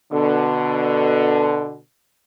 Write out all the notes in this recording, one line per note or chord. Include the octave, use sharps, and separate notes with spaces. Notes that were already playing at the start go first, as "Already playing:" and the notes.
B2 D3